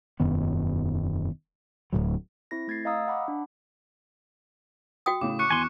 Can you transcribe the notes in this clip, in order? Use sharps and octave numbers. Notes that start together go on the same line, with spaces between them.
E1 F#2 D#3 B3
D1 D2 A2 F#3
C4 E4 A#6
A3 G#6 A6 C7
D#5 F5 A#5 D#6 E6
F#5 B5 D6
D4
F#4 G5 D#6
A2 C#3 D6
C#6 F#6 C#7
E2 G#5 C6